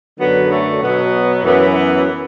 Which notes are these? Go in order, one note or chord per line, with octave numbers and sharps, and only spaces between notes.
F#2 D3 F#3 B3
A3
B2 F#3 B3
F#2 E3 B3
B3